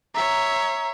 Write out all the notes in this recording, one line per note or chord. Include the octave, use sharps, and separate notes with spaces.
C#5 E5 A#5